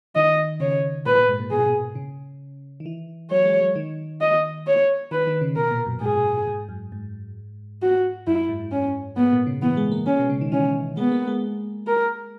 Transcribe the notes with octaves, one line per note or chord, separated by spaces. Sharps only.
D#3 D#5
C#3 C#5
A#2 B4
A#2
G#2
A#2
B2 G#4
A#2
B2
C#3
D#3
E3
F#3 C#5
G#3
F#3
D#3
D#5
C#5
D#3 B4
D#3
C#3
B2 A#4
A#2
F#2
G#2 G#4
G#2
F#2
G#2
F#4
F#2 E4
G#2
C#4
G#2 B3
A#2
C#3
E3 B3
G#3
A#3
G#3 C#4
B2
C#3
D#3
E3 C#4
G#3 B3
A#3
G#3
A#4